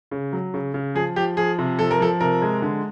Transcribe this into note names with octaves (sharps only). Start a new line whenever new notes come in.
C#3
F#3
C#3
C#3
F3 G#4
F3 G4
F3 G#4
C3
F3 A4
A#4
F3 A4
C3 A#4
G#3
D3